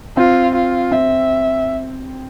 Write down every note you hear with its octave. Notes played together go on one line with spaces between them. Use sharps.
C4 F4
F4
C4 E5